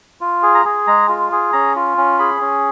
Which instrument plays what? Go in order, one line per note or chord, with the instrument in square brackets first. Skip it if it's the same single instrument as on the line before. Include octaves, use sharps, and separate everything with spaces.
[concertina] F4
G#4
A#5
G#4
G#3 A#5
F4
G#4
C#4 A#5
F4
C#4
G#4 B5
C#4